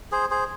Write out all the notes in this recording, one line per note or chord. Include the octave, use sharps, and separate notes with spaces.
G#4 C5
G#4 C5